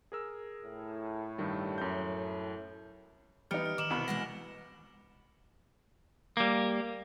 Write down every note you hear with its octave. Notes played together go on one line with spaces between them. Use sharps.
G#4 A#4 E6
A2
G2 D#3 G3
F#2 G6
E3 G3 B3 D#4 F6 C#7 D7
F6
D#3 D6 E7 F#7
C2 B2 B5
E3 G#3 F#5 A#6
G3 A#3